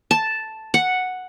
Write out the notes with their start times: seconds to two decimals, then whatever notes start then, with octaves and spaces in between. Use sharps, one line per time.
0.11 A5
0.74 F#5